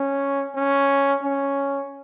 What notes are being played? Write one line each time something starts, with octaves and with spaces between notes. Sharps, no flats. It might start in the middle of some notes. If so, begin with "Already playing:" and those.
Already playing: C#4
C#4
C#4